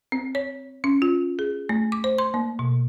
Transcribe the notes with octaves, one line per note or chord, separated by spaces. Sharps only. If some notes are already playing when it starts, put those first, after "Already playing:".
C4
C#5
C#4
F4
G#4
A3
D6
C5
C6
A#3
B2